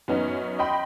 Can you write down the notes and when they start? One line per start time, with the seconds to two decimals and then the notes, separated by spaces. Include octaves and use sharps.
0.08 F#2 B3 C#4 D#4
0.59 D#5 G5 B5 C6